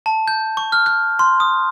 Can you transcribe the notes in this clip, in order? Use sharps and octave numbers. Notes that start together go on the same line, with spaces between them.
A5
G6
C#6
F6
F#6
C6
D#6